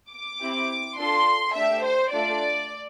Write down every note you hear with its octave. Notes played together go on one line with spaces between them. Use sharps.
D6
C4 E4 G4
D4 F4 A4 C6
A3 D4 G4 E5
C5
A3 D4 F4 A4 D5